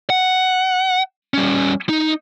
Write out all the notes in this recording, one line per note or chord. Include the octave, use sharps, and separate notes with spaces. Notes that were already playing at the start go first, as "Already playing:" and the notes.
F#5
G3 C#4
D#4